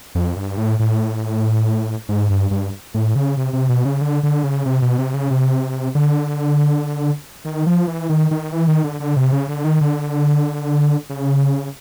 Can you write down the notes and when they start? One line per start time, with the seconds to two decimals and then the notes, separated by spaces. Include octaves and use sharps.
0.15 F2
0.37 G2
0.57 A2
0.79 A2
2.09 G#2
2.30 G2
2.51 G2
2.94 A2
3.15 C#3
3.37 C3
3.53 C3
3.69 B2
3.85 C#3
4.01 D3
4.23 D3
4.44 C#3
4.65 C3
4.82 B2
4.98 C3
5.14 C#3
5.31 C3
5.95 D3
7.45 D#3
7.66 F3
7.88 E3
8.09 D#3
8.31 D#3
8.52 E3
8.68 D#3
8.84 D3
9.00 D3
9.16 C3
9.32 C#3
9.48 D3
9.64 D#3
9.81 D3
11.10 C#3